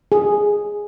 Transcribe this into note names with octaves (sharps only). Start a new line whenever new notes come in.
G#4